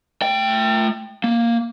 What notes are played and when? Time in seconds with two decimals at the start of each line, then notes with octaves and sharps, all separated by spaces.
0.22 A3 G5
1.24 A#3